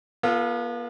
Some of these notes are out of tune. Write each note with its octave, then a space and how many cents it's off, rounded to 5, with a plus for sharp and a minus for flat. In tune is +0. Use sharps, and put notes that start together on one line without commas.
B3 -40 F4 +0 A4 +5